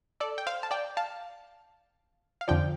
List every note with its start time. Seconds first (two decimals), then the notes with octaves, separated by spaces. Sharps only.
0.20 A4 D5
0.38 G5
0.47 C5 F5
0.63 A5
0.71 D5 G5
0.97 F5 A5
2.41 F5
2.48 F2 D3 F3 D5 G5